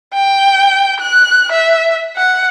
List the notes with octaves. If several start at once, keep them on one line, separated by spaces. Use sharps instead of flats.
G5
F#6
E5
F#5